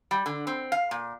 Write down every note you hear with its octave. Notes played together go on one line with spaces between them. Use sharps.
G3
D3
C4
F5
A#2